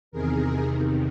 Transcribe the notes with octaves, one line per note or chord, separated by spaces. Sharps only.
E2 C3 D#3 G#4 A#4